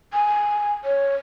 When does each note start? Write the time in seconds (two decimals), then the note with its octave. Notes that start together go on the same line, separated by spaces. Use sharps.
0.13 G#5
0.85 C#5